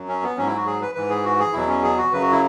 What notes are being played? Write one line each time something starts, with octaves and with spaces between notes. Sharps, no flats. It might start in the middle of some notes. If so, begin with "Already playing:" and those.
Already playing: F#2 F#3
C#4
B3
G#2 F#3 C#4
E4
F#4
G#4
B4
G#2 E3 B4
G#4
F#4
G#4
E2 B2 F#3 E4
C#4
G#4
F#4
F#2 C#3 F#3 B4
F#4
E4